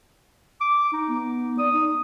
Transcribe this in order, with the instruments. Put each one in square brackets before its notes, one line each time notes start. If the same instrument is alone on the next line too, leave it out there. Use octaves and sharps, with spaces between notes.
[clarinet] D6
D#4
[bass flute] B3
[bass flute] D5 [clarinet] D#6
[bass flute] D#4